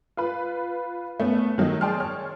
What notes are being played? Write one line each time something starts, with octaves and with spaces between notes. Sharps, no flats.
F4 B4
A3 B3 C#4
D#3 F#3 A3 D#4
G#4 D5 G5 A5 C6 F6
C#5 F6